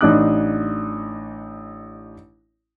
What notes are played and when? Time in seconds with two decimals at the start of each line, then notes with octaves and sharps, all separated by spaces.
0.01 A1 D4 D#4 D6 F#6